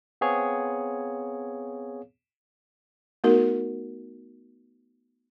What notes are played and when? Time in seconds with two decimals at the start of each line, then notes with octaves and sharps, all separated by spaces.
0.21 B3 C4 G#4 C#5 F5
3.24 A3 B3 D#4 F#4 A#4